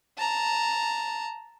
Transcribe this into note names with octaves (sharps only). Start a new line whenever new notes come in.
A5 A#5